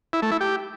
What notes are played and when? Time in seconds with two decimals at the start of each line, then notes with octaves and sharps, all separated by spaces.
0.13 E4
0.22 A3
0.31 E4
0.41 G4